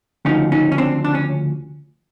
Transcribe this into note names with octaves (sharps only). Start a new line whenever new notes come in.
D2 C#3 F3 C#4 D#4
C#4 D#4
C#4
C4 D4
D4
C#4